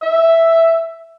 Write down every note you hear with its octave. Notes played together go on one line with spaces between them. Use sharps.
E5